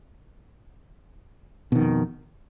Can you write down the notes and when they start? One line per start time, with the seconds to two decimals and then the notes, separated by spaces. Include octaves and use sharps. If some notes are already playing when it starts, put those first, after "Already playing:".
1.72 B2
1.75 D#3
1.79 F2